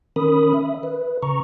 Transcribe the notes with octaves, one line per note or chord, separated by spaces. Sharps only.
D#3 C#4 A#4 B5 D#6
E5
B4
C#3 A#5 C#6